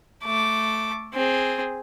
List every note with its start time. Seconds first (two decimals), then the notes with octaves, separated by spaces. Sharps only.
0.24 A3 D6
1.14 C4 G#4